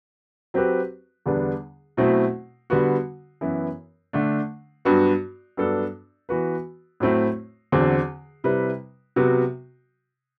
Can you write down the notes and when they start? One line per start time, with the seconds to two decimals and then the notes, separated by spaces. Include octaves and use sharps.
0.54 F#3 C4 G4 B4
1.26 E2 D3 G3 B3 D4
1.97 B2 F#3 A3 C4 E4
2.70 D3 G3 B3 F#4
3.41 F#2 E3 B3 E4
4.13 D3 A3 D4
4.85 G2 F#3 B3 F#4
5.57 G2 F#3 B3 D4 A4
6.29 E3 B3 F#4 B4
7.00 A2 F#3 A3 C4 E4
7.72 E2 D3 F#3 C4
8.44 C3 G3 C4 E4 B4
9.16 C3 F#3 B3 F#4